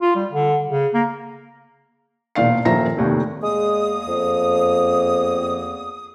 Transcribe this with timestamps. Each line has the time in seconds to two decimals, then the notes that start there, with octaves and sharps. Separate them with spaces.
0.02 F4
0.15 G3
0.33 D3
0.70 C#3
0.94 A#3
2.35 E1 A#2 D5 F5 C7
2.65 D#1 F3 A#3 E5 A#5 A#6
2.97 F1 D#2 A2 D#3
3.43 E2 G#3 A#3 D#6
4.08 F2